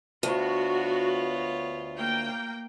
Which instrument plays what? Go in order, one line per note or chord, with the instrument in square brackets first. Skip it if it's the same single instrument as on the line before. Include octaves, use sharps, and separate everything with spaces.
[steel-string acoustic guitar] D2 [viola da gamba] B3 F4 C#5 [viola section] F#4
[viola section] A#3 G5